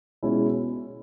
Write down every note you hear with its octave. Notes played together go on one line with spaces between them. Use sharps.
B2 G#3 C#4 E4